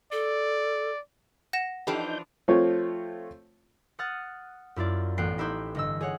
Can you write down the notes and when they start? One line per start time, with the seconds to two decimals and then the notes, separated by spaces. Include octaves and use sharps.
0.12 A4 D5
1.53 F#5 A#6 E7
1.87 E3 F3 D4 D#4 G4 A4 B4 G6
2.48 F3 A3 C4 F4 C#5
3.99 F#5 D#6 F6 F#6 A6
4.76 F#2 E4 F4 D5
5.18 A1 B3 G5 F#6 C7
5.38 D#4 E4 G4 C5 B5
5.75 G1 D#5 E6
6.01 G#4 C#5 F#5